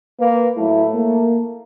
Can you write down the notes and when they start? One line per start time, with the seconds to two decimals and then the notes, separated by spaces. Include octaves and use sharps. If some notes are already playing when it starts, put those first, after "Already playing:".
0.20 A#3 B4
0.57 A2 F#3 A3 E4
0.95 A#3